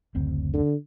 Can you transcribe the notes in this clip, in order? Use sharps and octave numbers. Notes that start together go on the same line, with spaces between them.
F#1 D2 C4
D3